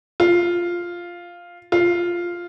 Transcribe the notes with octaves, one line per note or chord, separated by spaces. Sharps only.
F4
F4